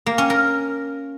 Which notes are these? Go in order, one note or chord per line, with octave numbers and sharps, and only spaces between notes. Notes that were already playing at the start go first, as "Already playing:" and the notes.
A#3
C#4
A#4